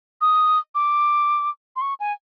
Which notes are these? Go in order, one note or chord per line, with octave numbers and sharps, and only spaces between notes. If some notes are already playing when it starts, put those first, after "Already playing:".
D#6
D6
C6
C#6
G#5